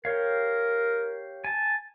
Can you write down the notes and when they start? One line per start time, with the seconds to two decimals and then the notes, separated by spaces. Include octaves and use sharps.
0.05 G4 A#4 C#5 F5
1.45 G#5 A5